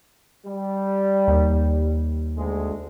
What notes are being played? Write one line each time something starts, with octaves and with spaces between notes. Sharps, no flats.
G3
D#2
D2 G#3